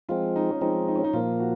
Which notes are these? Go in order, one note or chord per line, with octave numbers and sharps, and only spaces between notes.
F3 G#3 C4 F4
D#4
C#4
F3 G#3 C4 D#4
D#4
C#4
D#4
A#2 F3 A#3 F4
F#4